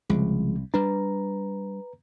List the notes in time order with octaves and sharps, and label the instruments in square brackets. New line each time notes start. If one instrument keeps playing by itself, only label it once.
[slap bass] C2 [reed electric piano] C#3 F3 G#3
[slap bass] G3 D4 [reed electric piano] B4 A#5